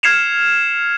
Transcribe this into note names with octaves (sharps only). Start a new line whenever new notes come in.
F6 G#6 C7 C#7 E7 F7